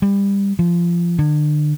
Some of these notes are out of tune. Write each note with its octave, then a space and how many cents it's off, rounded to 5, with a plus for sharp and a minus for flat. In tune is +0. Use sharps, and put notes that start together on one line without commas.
G3 +25
F3 -20
D3 +35